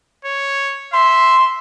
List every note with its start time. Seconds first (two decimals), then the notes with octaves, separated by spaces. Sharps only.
0.25 C#5
0.93 E5 C6